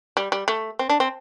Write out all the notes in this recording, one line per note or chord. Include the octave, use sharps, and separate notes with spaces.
G3
G3
A3
C4
D4
C4